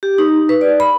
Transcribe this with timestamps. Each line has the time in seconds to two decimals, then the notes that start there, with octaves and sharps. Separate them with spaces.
0.03 G4
0.18 D#4
0.49 B4
0.61 D5
0.80 B5